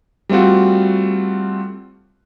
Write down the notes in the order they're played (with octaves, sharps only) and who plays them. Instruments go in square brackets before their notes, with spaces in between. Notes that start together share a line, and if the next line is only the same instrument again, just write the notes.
[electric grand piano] G3 A3 C4 F4 F#4